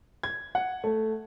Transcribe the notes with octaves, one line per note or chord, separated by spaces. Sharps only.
G#6
F#5
A3